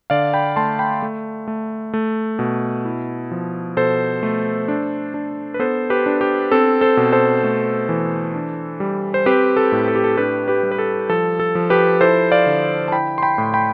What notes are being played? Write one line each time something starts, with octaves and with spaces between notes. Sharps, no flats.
D3 D5 F5
G5 B5
A3 A5 C6
G5 B5
A3
A3
A3
B2
E4
F3
B2 A4 C5
A3
D4
D4
B4
B3 A4 C5
G4 B4
D4
G4
C4 A4
A4 C5
B2
A4 C5
A3
E3
D4
G3
C5
C4 G4 B4
A4
A2
A4
G4
A4
D4 G4 B4
G4 B4
G3
B4
A4
F3 A4
A4
F3
G4 B4
E4 A4 C5
D5 F5
D3
A5
E4 G5 B5
C6
G5 B5
A2
G5 B5